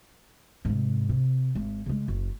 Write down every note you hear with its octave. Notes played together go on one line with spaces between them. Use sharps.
G#2 C3
C3
G#1
C#3 G#3
F#1